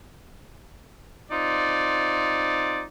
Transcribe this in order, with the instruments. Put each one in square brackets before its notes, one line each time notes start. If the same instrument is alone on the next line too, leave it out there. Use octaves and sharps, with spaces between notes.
[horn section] C4 D#4 F4 D5